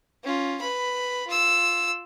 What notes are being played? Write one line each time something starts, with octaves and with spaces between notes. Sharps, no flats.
C#4 F4
B4 B5
F4 E6